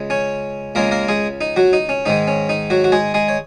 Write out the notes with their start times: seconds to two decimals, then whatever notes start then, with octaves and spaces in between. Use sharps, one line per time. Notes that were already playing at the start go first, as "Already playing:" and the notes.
Already playing: C#2 C#3 G#3
0.10 C#4 C#5
0.75 C#2 C#3 G#3 A#3 A#4
0.91 A#3 A#4
1.09 G#3 G#4
1.41 D#4
1.56 F#3 F#4
1.73 D#4
1.89 C#4
2.06 G#2 D#3 G#3 D#4
2.28 C#4
2.49 D#4
2.70 F#3 F#4
2.84 F#4
2.92 G#3 G#4
3.14 G#3 G#4
3.29 C#5